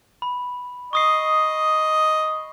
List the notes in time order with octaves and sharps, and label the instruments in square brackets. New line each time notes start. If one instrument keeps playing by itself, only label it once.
[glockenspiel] B5
[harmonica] D#5 [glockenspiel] C#6 D#6 C7